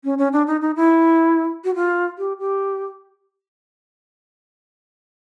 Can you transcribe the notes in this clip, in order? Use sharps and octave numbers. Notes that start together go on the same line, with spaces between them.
C#4
C#4
D4
D#4
D#4
E4
F#4
F4
G4
G4